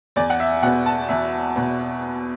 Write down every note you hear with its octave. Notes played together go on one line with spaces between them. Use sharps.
E2 D5
F#5
E5
B2 B3 F#5
A5
E2 E5
B2 B3